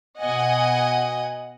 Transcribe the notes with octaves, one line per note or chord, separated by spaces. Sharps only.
B2 D#5 F#5 G#5